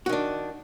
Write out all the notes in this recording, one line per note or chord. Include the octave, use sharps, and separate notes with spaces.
D#3 D4 F#4